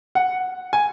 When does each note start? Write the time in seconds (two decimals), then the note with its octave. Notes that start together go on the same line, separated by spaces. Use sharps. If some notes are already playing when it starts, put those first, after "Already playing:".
0.15 F#5
0.73 G#5